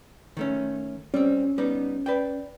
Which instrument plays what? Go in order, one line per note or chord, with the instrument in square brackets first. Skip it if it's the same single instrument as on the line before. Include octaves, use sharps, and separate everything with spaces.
[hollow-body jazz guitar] D#3 A3 C#4
[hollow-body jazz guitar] G3 C4 [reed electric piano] C#4
[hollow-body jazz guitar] G3 B3 D#4
B4 D5 G5